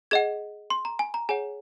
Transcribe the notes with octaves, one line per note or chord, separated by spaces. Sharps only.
G#4 D#5 F#5 G#6
C6
A#5
G#5
A#5
G#4 C#5 F#5 G#5